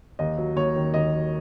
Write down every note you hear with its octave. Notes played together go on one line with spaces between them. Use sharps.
D#2 D#5
F#3
D#2 C#5
D#3
D#2 D#5
F#3